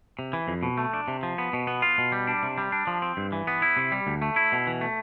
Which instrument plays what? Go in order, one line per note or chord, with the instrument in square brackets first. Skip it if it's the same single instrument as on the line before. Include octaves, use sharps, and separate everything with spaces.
[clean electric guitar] C3
E3
F2
B2
A3
D4
C3
F3
B3
B2
B3
F4
B2
G3
D4
C3
G3
D4
F3
C4
G2
E3
B3
E4
C3
G3
D2
A3
E4
B2
E3
A3